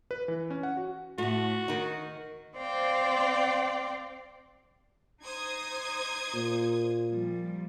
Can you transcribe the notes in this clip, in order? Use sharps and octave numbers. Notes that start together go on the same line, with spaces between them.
B4
E3
C#4
F#5
F#4
A2 A3 F#4
D#3 D#4
C4 C5 D5 F5 G5
D#4 C5 D#6 G#6
A#2
F3 G3